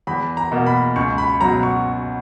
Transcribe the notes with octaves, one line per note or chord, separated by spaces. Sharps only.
E2 B5
A#5
B2 A#3
B5
C#2 C#6
B5
B2 F#3 A#5
C#6